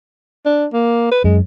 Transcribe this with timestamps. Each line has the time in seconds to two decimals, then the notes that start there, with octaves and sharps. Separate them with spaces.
0.45 D4
0.73 A#3
1.11 B4
1.24 F#2 G#3